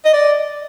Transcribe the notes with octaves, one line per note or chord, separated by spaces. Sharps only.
D#5
D5